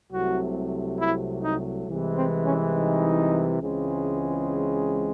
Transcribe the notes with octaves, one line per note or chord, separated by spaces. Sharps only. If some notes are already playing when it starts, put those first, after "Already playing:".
C2 C3 F#3 A3 F#4
E4
D#4
C2 C3 E3 G#3
C4
C#4
D#4
C#2 C#3 E3 G#3 C4